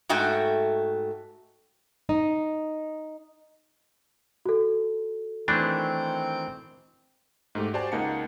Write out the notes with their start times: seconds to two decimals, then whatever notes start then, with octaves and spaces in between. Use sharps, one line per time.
0.09 G#2 A3 F#4 G5
2.09 D#4
4.46 F#4 A4
5.48 D#3 E3 A3 C4 D4
7.55 G#2 A3 G4
7.73 F#4 G4 C5 D5 G#5 A5
7.92 C#2 A#3 D#4 F#5 A5 C#7